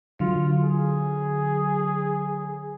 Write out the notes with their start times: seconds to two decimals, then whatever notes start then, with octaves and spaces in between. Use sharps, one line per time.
0.20 D3 F#3 F4
0.63 G#4